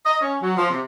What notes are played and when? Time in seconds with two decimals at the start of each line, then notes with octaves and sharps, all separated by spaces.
0.04 D#5
0.21 C#4
0.40 F#3
0.58 F3
0.70 C3